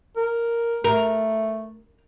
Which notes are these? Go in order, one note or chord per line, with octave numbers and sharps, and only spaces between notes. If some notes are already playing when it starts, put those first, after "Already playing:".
A#4
A3 A#4